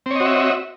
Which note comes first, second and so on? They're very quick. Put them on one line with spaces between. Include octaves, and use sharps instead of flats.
C4 C#5 D#5 F#4 E5